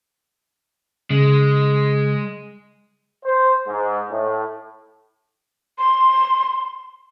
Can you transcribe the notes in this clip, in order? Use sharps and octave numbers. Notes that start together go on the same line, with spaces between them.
C#3 G#3
C5
G#2
A2
C6